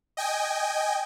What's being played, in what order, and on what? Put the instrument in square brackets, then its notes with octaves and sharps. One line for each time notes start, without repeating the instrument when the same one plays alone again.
[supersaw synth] D#5 G5 G#5